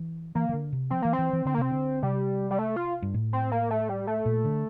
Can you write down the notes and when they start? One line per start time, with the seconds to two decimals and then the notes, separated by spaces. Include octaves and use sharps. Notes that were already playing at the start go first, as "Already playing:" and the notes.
Already playing: E3
0.35 E3 A#3
0.49 E3
0.53 D3
0.73 C3
0.90 F3 C4
1.02 E3 A#3
1.13 C4
1.19 E3
1.33 E3
1.45 D3 C4
1.54 A#3
1.58 C3 C4
1.71 D3
2.03 C3 G3
2.51 G3
2.59 A3
2.76 F4
3.02 G2
3.14 A2
3.33 C4
3.52 A#3
3.71 A3
3.89 G3
4.07 A3
4.26 A#2
4.44 D3